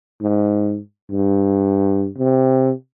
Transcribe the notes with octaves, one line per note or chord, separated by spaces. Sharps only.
G#2
G2
C3